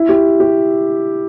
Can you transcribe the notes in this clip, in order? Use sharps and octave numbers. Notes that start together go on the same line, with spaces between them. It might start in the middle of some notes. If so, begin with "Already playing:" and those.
Already playing: E4
G4
G4